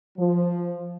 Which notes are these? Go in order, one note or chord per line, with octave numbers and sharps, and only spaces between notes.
F3